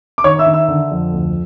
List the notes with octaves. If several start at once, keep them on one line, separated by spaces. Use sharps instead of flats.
D6
D#3 C#5 C#6
E5 E6
D#3
E5 E6
D3
F2
D2